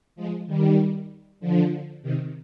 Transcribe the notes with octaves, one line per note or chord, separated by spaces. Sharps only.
F3 G#3
D#3 G3
D3 F3
C3 D#3